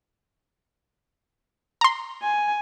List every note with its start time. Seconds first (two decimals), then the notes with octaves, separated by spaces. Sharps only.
1.81 A#5 C6
2.22 G#5